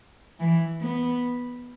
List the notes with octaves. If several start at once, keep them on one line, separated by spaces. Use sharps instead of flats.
E3
B3